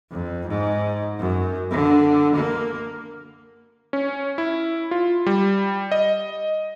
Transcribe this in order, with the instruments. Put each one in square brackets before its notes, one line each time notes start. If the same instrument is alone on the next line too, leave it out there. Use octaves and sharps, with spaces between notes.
[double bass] F2
G#2
F#2
D3
A#3
[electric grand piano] C#4
E4
F4
G3
D#5